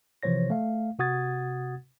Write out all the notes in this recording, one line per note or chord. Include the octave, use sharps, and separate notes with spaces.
C3 E3 F3 C5 C#5 A#6
A3 F5
C3 F#4 F#5 D#6 G#6 A6